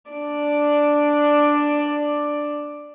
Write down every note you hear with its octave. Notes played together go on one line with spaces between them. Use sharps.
D4 D5